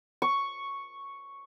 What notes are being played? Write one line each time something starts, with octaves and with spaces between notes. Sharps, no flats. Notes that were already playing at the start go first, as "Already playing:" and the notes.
C#6